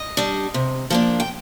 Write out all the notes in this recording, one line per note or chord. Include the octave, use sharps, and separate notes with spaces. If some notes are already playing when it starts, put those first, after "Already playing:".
Already playing: D#5
G3 D4
C3
F3 A#3 D4
G5